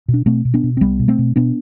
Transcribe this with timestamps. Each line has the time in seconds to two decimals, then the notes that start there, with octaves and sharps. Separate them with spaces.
0.08 B2
0.14 D4
0.26 B2 A3 C4
0.45 B2
0.54 B3 D4
0.64 B2
0.77 C4
0.81 C2 G3 B3
0.99 B2
1.08 A3 C4
1.19 B2
1.36 B2 B3 D4